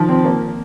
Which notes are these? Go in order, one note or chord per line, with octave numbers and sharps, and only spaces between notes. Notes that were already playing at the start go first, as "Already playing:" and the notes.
Already playing: D#3 F3
C4
A#3